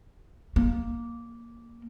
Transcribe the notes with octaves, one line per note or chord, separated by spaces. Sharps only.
A#3